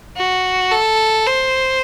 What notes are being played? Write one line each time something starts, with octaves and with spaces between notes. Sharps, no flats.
F#4
A4
C5